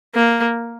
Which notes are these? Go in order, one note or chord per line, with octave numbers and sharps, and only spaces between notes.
A#3